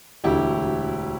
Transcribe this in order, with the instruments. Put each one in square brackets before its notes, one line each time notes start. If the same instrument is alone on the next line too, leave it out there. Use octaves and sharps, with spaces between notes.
[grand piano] E1 D2 D3 E4 G4